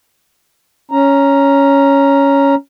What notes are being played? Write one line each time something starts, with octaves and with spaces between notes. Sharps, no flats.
C#4 A#5